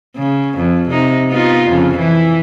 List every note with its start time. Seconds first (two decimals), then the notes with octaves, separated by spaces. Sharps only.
0.16 C#3
0.57 F2
0.89 C3 D#4
1.30 B3 D#4 F4
1.68 F2 C#3
1.98 E3